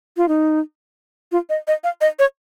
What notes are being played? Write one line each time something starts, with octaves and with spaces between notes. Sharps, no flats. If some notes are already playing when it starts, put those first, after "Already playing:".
F4
D#4
F4
D#5
D#5
F5
D#5
C#5